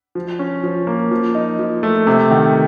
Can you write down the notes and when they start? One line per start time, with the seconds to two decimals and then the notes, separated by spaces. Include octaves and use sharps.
0.15 F3
0.39 C#4
0.63 F3
0.87 A#3
1.11 F3
1.35 D#4
1.59 F3
1.83 A3
2.07 C3
2.31 D#3